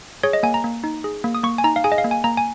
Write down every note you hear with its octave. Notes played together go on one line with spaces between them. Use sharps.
G#4 C#5
D#5
A#3 G#5
A#5
A#3
D#4
G#4
A#3
D#6
A#3 C#6
G#5
D#4 A#5
F5
G#4 G#5
D#5
F5
A#3
G#5
A#3 A#5
G#5